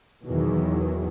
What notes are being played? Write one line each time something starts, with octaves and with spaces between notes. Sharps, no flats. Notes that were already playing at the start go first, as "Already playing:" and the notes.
E2 B2 D#3 E3 F#3